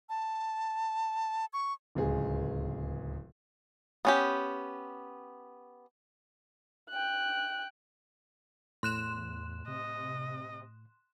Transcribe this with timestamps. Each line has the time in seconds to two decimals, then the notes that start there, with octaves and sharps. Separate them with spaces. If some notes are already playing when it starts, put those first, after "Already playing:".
0.09 A5
1.53 C#6
1.95 D1 C#2 G#4
4.05 B3 C#4 G4
6.90 G5 F#6
8.83 E2 A2 C6 F#6 E7
9.68 C3 D#5